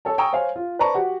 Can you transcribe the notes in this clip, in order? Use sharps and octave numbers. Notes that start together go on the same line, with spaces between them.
A4 C#5 A5
G5 G#5 A#5 C#6 D#6 E6
C5 C#5 F5 G#5
F4
B4 C5 D5 A5 A#5 C#6
F#4 G4 F#5